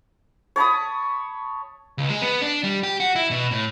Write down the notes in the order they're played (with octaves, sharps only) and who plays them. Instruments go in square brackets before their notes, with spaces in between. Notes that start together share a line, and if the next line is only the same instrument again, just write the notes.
[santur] C#5 A5 B5 D#6
[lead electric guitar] C#2
G#3
B3
D4
G3
G4
F#4
E4
B2
A2